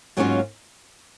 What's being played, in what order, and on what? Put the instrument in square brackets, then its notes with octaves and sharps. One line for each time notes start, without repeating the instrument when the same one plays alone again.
[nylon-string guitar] G#2 F#3 A#3 C#4 F4